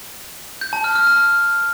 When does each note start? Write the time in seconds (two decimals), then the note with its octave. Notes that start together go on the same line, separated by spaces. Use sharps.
0.61 G6
0.73 A5
0.84 F6
0.96 F6
1.07 A5